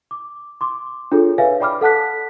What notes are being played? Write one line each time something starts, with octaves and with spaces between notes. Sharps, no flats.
D6
C6 D6
D4 F4 G#4 A4 C#5
B4 C#5 E5 F5 G#5
D5 G5 B5 D6 F6
A4 F#5 A5 F#6 B6